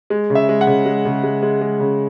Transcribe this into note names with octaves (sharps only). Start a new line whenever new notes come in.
G#3
C#3
E5
G#3
F#5
C#3
G#3
C#3
G#3
G#3
G#3
C#3